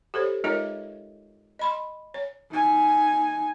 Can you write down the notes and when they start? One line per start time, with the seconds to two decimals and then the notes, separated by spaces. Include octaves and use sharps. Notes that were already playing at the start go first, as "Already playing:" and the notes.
0.14 G4 A4 C5 C#5
0.44 G#3 D#4 F4 A#4 C#5 D#5
1.59 D#5 B5 C6
2.14 C#5
2.51 D#4 G#5